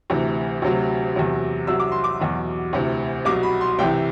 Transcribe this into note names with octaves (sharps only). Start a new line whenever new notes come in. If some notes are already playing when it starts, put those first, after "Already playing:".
D2 C3 E3
D2 C3 F#3
E2 C3 F#3
C2 C3 F#3 E6
D6
C6
D6
E2 B2 F#3
D2 C3 E3
C2 B2 F#3 D6
B5
C6
C2 C3 E3 G5